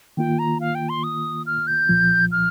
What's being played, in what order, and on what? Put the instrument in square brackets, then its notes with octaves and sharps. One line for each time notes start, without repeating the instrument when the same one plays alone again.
[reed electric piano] D#3 A#3 F4 [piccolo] G5
[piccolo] A#5
F5
G5
C6
D#6
F6
G6
[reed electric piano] C2 A#2 F3
[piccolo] F6